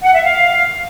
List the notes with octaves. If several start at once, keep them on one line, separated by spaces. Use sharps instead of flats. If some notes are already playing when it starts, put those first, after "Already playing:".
F#5
E5
F5